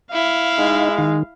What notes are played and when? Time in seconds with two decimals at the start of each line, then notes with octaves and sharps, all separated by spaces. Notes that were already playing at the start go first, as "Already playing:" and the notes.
0.12 E4 F5
0.58 G#3 D#4
0.98 D#3